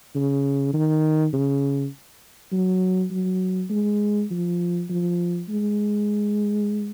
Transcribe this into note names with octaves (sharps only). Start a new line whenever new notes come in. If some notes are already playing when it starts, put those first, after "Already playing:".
C#3
D#3
C#3
F#3
F#3
G#3
F3
F3
G#3